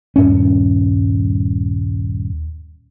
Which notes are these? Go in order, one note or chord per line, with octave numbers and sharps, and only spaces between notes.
D#1 G2 C#4